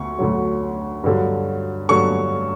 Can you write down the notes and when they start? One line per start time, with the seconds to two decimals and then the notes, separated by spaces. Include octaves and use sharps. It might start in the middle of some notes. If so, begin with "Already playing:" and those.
Already playing: D2 C#6
0.19 D2 D3 F#3
1.04 G2 D3 F#3
1.89 G2 D3 F#3 C#6